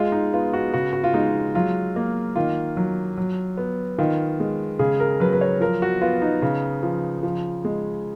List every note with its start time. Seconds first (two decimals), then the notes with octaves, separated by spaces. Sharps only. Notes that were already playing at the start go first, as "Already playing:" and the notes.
Already playing: G#3 F4
0.12 D#4
0.33 B3 F4
0.53 F#4
0.74 C#3 F#4
0.93 F#4
1.04 F4
1.14 G#3 D#4
1.55 F#3 F4
1.96 A#3
2.36 D#3 F4
2.77 F#3
3.17 F#3
3.57 B3
3.98 D#3 F4
4.40 G#3
4.79 C#3 G#4
5.00 A#4
5.20 F#3 B4
5.33 B4
5.41 C#5
5.61 F3 A#4
5.82 F#4
6.02 B3 F4
6.22 D#4
6.42 C#3
6.83 F3
7.23 F3
7.65 G#3